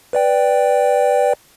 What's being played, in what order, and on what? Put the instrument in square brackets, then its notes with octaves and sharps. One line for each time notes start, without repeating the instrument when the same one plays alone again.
[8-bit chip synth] B4 D5 G5